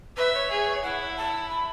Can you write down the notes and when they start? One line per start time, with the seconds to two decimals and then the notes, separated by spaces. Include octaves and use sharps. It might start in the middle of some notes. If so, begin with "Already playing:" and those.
0.16 B4 E5
0.34 C#5
0.51 G#4
0.83 E4 F#5
1.17 A5
1.50 B5